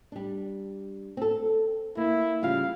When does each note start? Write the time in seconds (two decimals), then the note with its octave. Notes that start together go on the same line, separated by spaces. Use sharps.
0.12 G3 D4
1.17 C4 A4
1.97 A#3 E4
2.43 C#3 G3 F4 F5